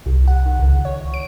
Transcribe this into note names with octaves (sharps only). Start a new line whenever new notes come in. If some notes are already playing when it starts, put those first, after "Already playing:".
C2
F#5
D#3
C#2
C#5
D7